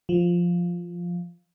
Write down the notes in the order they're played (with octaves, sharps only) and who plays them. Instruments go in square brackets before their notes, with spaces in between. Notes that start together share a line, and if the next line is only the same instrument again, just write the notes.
[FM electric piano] F3